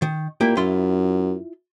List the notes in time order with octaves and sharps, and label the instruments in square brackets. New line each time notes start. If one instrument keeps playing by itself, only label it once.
[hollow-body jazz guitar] D#3
[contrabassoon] A#2 [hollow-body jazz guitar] A#3 E4 G4
[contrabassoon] F#2 [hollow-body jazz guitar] E4 F4 C6